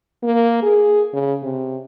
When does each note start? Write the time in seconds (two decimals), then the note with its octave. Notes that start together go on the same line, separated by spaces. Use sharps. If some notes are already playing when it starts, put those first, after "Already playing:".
0.23 A#3
0.63 G#4
1.13 C#3
1.43 C3